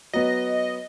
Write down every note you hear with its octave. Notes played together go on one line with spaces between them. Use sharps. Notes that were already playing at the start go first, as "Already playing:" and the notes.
F#3 B3 D#5